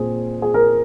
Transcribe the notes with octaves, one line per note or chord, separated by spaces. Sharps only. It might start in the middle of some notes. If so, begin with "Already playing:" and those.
Already playing: A#2 C4 G#4
G#4
A#4